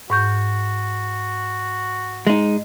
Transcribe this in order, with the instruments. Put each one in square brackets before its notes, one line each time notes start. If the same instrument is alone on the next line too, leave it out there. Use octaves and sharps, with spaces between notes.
[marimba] G#2 C#6 G6 [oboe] F#4
[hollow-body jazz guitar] G#3 D#4